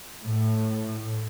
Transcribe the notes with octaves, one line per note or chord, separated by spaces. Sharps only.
A2